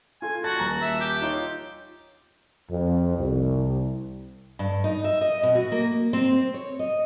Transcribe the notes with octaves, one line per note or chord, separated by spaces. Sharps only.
F4 A4 G#5
F#4 A5 F#6 A6
D#1 A#5 F#6
E5
G4
D#4 F4 C#5
F2
C2
G2
D#4
E5
D#5
B2
F#4
A#3
C4
C#5
D#5